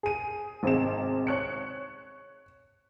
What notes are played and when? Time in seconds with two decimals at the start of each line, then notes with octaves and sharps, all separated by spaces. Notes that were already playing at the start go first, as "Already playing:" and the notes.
0.03 G#4 D#7
0.63 G#1 C3 G#3 E7
1.27 C#5 F#6 C#7